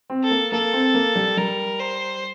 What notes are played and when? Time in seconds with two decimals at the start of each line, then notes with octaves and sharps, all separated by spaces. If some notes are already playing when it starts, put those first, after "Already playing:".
0.10 C4
0.23 A4
0.31 A#3
0.52 A#3 A4
0.73 C4
0.94 A#3
1.16 G3
1.37 G3 A#4
1.79 C5